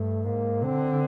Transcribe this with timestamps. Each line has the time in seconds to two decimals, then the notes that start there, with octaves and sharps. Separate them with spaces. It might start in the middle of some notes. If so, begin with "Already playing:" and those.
Already playing: G2 A3
0.25 G#2 A#3
0.64 D3 C4